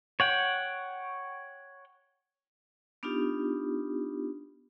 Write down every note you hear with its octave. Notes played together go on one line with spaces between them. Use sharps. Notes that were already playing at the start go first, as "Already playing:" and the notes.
C#5 F#5 G5
B3 D4 D#4 F4 G4